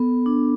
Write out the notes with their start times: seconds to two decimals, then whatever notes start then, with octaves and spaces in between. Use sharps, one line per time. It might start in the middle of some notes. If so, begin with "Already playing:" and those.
Already playing: B3 A4
0.26 D4